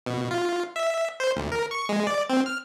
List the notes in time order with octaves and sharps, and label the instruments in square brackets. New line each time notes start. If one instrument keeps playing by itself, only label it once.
[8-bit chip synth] B2
F4
E5
C5
D2
A#4
C#6
G#3
D5
C4
F6